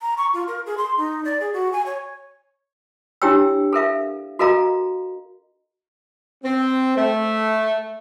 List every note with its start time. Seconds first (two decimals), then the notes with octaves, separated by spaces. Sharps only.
0.01 A#5
0.18 C#6
0.34 F4
0.48 A#4
0.66 G#4
0.78 C6
0.97 D#4
1.25 D5
1.40 G#4
1.53 F#4
1.73 G#5
1.86 C#5
3.22 D4 E4 G4 C#5 G5 E6
3.73 A4 A#4 E5 F5
4.39 F#4 A4 A#4 D#5 F5 A#5
6.44 C4
6.97 A3